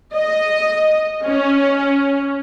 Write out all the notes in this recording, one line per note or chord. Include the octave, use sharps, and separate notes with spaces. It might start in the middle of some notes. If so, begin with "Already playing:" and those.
D#5
C#4